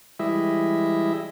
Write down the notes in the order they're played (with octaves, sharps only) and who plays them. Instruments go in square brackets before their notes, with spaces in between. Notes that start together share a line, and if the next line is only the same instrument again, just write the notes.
[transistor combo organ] E3 G3 G#3 E4 D#5 E5